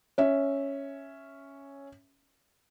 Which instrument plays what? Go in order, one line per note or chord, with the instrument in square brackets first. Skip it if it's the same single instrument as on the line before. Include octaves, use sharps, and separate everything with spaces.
[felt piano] C#4 E5